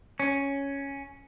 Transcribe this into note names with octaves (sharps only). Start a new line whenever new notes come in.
C#4